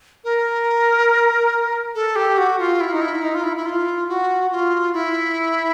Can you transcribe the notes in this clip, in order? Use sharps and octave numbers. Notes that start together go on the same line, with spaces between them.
A#4
A4
G4
F#4
F4
E4
D#4
E4
D#4
F4
E4
E4
F4
F#4
F4
E4